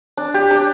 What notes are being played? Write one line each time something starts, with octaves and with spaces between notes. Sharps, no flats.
D4
G4
D4